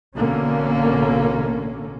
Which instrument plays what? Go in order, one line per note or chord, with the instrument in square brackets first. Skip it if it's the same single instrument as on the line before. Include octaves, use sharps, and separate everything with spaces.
[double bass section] A1 B2 D3 A#3 C#4